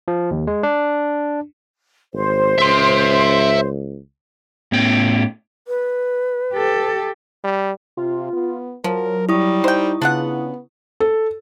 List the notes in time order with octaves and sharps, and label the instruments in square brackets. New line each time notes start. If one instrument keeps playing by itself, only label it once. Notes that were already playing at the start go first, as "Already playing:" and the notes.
[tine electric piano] F3
D#2
G#3
D4
[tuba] G#1 [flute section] C5
[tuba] C#2 [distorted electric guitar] E5 C6
[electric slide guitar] A2 B3 C#4 G5
[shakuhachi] B4
[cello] G4 A4
[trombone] G3
[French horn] C3 [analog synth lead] F4
[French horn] B3
[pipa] F3 [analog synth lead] F#3 [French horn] A#4
[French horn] G3 [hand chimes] E4 C#6 D#6
[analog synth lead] D#4 [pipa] C5 G5
[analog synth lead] C#3 [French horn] B3 [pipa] D4 F4 F#5
[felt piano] A4